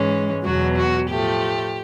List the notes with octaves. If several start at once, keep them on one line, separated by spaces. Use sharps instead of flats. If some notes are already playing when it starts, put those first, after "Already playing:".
Already playing: G#2 E3 G#3 C#4
E2 B2 F#3 F#4
F#4
A2 F3 A3 G4